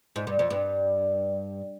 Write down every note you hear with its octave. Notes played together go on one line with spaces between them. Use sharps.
G#2
G2
F2
G2